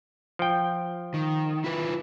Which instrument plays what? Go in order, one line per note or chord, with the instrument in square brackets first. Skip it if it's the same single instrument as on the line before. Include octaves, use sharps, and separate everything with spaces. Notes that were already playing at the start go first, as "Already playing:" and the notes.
[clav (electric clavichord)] F3 G5
[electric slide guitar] D#3
E4 F4 B4